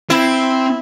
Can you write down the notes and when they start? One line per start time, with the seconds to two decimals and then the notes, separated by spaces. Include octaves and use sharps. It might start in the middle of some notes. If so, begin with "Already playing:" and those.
0.10 C4 E4